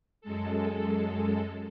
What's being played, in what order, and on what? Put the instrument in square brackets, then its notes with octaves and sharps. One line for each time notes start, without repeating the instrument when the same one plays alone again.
[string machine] F#2 G#3 A4